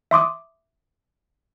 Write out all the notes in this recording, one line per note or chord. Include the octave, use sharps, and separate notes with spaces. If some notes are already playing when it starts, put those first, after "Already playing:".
E5 C6 D6 D#6